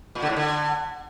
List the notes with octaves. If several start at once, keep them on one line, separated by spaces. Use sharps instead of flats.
A#2
D3
A2
D3